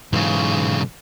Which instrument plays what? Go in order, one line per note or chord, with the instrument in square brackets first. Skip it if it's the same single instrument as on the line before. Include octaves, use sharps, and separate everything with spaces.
[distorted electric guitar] B1 C#3 [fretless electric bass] G#2 E3